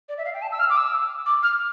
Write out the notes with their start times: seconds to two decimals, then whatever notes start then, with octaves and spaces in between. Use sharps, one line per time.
0.09 D5
0.18 E5
0.25 F5
0.34 G5
0.42 A5
0.52 E6
0.59 F6
0.70 D6
0.77 E6
1.26 D6
1.43 F6